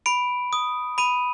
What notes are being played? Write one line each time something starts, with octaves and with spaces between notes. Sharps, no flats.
B5 D7
D#6
B5 D#7